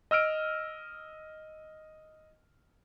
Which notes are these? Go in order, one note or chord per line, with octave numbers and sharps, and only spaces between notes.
D#5 E6 F6 D7